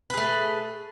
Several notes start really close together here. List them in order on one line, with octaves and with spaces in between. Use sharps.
B4 G#4 A3